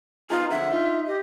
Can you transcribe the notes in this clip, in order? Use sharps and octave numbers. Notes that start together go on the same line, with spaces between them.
B3 D#4 F4 G#4 A#5
F2 D3 E5 F#5
D#4 F4
G4 D#5